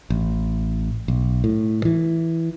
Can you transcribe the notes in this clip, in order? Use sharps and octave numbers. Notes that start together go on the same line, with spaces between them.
A1
B1
A2
E3